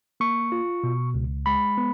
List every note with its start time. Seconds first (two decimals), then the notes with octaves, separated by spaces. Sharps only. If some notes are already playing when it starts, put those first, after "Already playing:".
0.20 A#3 C#6
0.52 F4
0.84 B2
1.14 C#2
1.46 G#3 B5
1.78 B3